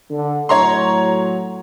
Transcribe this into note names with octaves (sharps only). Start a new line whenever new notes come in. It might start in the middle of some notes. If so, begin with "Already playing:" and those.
D3
A2 F#3 C#5 A#5 C6